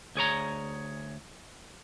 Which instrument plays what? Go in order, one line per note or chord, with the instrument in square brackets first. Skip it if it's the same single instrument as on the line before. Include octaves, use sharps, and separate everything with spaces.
[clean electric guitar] D2 G#4 C#5 A#5